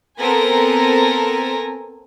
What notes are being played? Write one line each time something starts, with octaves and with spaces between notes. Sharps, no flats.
B3 C4 A4 A#4 G#5 A#6